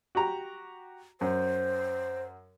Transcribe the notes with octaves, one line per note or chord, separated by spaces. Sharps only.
F#4 G4 A#5
F#2 C5